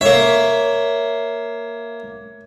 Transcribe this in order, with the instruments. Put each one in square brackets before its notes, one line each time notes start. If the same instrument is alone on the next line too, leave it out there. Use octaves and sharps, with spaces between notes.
[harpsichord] A#3 E5 [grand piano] C#5